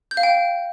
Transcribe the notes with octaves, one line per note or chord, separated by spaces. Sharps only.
G6
F5
G5